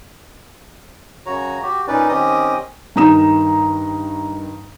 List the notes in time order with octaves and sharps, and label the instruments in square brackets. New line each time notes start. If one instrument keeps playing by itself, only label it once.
[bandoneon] F#2 C#3 F#4 C#5 A#5
F#4 G4
A#2 C#4 D#4 B4 D5
D#3 C4 C#4 G4 D#5 D#6
[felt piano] G2 D#3 A#5 D#6 E7